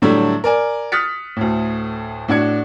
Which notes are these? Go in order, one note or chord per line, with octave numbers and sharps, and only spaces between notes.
A2 D3 F#3 G3 A3 E4
A#4 D5 G#5
D#6 F6 F#6 A6 B6 C#7
D2 A2
A2 D4 F#4 G#6 C#7